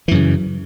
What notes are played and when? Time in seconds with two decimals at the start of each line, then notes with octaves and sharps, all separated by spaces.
0.08 E3
0.11 F#2
0.15 C#3